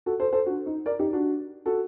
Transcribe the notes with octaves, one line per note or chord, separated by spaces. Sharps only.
F#4 A4
A4 C5
A4 C5
D4 F#4
D#4
A#4 D5
D#4 G4
D4 F#4
F#4 A4